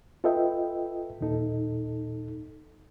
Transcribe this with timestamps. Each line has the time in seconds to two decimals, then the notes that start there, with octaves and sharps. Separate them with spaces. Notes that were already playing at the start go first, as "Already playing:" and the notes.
0.24 F4 A4 B4 D#5 E5 G5
1.21 D#2 A#2 D#4 A4